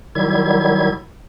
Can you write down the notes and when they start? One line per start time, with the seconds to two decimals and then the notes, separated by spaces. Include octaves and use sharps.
0.15 D#3 F#3 G3 E4 G#6